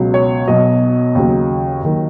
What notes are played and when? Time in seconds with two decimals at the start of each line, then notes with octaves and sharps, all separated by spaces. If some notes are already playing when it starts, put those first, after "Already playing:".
Already playing: C#2 B2 F#3
0.14 C#5
0.48 B1 B2 F#3 D#5
1.15 D#2 C#3 F#3
1.83 D#2 D#3 F#3